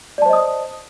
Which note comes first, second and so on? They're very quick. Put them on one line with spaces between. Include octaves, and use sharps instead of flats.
D5 A5 C5 D#5 D#6